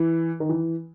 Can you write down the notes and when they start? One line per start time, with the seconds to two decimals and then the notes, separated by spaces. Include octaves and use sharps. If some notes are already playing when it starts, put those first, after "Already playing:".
Already playing: E3
0.40 D#3
0.49 E3